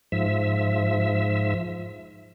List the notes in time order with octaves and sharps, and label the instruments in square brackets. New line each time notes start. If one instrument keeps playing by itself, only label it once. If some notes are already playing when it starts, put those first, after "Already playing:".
[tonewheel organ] G#2 F3 E5